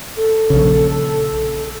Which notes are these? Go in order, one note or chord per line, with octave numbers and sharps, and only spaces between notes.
A4
A#1 C#3